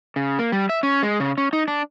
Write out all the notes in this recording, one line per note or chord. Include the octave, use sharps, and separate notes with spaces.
C#3
A#3
G3
E5
C#4
G#3
C#3
C#4
D#4
D4